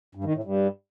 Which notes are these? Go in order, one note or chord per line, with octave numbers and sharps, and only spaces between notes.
G2
D#3
A2
G2